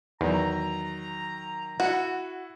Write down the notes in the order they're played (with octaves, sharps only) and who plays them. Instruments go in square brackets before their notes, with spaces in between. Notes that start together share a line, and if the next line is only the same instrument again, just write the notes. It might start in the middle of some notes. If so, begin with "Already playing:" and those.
[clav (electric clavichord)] E2 [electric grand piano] D#3 F#3 [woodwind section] A#5
[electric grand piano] E4 F#5 [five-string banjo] F#4